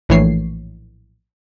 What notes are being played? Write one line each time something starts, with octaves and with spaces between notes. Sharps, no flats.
A#1 A2 E3 C#5 C7